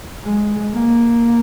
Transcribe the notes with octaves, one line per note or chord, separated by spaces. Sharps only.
G#3
A#3